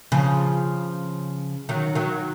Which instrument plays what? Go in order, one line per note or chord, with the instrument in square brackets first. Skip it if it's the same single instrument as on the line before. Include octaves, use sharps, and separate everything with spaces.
[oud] C#3 F3
D#3 F#3
D#3 F#3